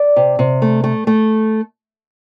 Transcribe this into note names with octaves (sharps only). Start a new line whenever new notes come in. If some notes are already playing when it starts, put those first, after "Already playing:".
Already playing: D5
C3
C3
A3
A3
A3